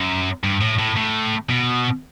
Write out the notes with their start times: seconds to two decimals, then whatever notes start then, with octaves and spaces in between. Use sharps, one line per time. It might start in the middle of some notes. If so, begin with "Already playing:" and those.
Already playing: F#2
0.44 G2
0.61 A2
0.79 A2
0.97 A2
1.50 B2